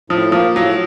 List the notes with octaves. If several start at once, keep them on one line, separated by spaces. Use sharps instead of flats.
A2 F3
F3 A#3
A2 F#3